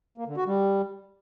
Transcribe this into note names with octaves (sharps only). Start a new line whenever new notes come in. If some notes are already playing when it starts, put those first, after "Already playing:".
A#3
D3
F#4
G3